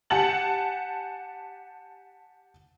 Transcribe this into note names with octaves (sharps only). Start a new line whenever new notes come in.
G4 F#5 G#5 A5 F#7